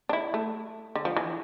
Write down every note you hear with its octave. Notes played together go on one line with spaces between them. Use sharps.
D4
E4
A3
D3
F3
E3